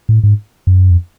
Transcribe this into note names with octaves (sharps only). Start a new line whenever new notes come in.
A2
G#2
F#2
F2